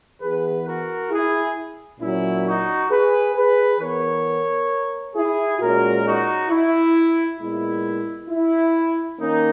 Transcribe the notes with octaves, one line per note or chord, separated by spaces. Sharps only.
E3 B3 G#4 B4
F#4 A#4
E4 G#4
A#2 F#3 C#4 E4
D#4 F#4
G#4 B4
G#4 B4
E3 B3 A#4 C#5
E4 G#4
A#2 G#3 C#4 F#4 A#4
D#4 F#4
E4
A#2 G#3 B3 E4
E4
D#3 A#3 C#4 D#4